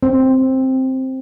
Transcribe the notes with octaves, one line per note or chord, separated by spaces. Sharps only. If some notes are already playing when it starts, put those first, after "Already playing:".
C4